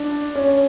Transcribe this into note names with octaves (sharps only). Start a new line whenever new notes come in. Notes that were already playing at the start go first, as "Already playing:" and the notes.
Already playing: D4
C#4